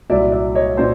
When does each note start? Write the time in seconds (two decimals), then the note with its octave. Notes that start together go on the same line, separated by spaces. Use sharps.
0.10 C2 A#2 F#3 D5 E5
0.32 D5 E5
0.55 C#5 D#5
0.77 A#2 F#3 C5 D5